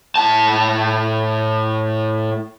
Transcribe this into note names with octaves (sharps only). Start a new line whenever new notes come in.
A2 A5